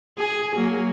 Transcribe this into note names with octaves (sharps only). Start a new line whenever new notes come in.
G#4
F#3 A#3